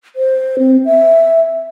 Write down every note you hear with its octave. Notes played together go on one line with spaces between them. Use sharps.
C5
C4
E5